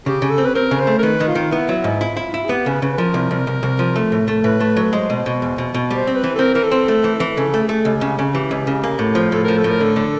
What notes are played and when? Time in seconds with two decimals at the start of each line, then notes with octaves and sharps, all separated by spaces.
0.06 C#3 G4
0.22 C#3
0.30 A4
0.38 C4
0.45 B4
0.55 C4 A#4
0.71 C#3
0.80 C5
0.87 A3
0.98 A#4
1.03 D#3 B4
1.20 D#3
1.28 F4
1.35 D#3
1.52 B3 E4
1.69 F#3
1.84 G#2
2.00 E4 F4
2.17 E4
2.34 E4
2.45 G#4
2.49 B3 G4
2.66 C#3 B4
2.82 C#3 B4
2.93 B4
2.98 F3 A#4
3.14 C2
3.31 C2
3.47 C2
3.63 C2
3.79 F3
3.96 A3
4.12 A2
4.28 A3
4.44 A2 B4
4.60 A3
4.76 F#3
4.83 B4
4.93 G#3 C5
5.10 B2
5.26 B2
5.42 E2
5.58 B2
5.74 B2
5.91 G3 C5
6.07 C4
6.15 B4
6.24 E3
6.35 A4
6.39 C4 A#4
6.55 E3 A#4
6.64 A4
6.71 C4
6.88 A3
7.04 E3
7.20 E3
7.37 C#3 A4
7.54 A3
7.61 G#4
7.69 A3
7.85 C#2 G4
8.01 C#3
8.19 C#3
8.24 G#4
8.34 E3 G4
8.51 C#2
8.67 C#3
8.83 A#3
8.99 A2
9.15 F3
9.32 A2 A4
9.44 F3 A#4
9.58 A4
9.64 A2
9.70 A#4
9.81 D3 A4
9.96 D3